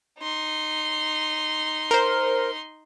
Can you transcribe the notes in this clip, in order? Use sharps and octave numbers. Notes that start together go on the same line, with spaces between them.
D#4 C6
A#4 C5